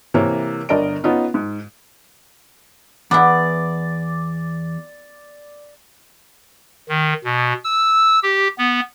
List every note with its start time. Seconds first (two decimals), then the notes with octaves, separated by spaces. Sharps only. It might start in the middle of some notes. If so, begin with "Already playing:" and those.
0.14 C3 E3 A#3 C#5
0.69 G1 D3 A#4 D5 D#5 D7
1.04 B3 C#4 D#4 F4
1.34 G#2
3.11 E2 B3 E4 D5
6.89 D#3
7.25 B2
7.64 E6
8.23 G4
8.58 B3